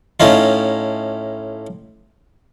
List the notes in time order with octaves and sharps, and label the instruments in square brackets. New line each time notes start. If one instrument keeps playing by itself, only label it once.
[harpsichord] A2 C#4 D#4 F4